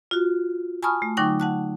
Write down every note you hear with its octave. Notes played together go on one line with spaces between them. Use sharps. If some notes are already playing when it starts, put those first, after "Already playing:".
F4 F#4
G#5 A5 B5 C#6 D#6 F6
A3
D3 F#3 D#4 G5 C#6 D6
F#5 A5 F#6